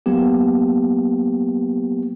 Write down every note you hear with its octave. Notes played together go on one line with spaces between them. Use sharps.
F#3 A#3 B3 G4